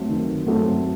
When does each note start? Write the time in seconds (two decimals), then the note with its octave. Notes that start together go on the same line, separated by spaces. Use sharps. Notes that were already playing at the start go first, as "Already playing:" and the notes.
Already playing: F#3 A3 C4
0.09 D#3
0.46 F#3 A3 C4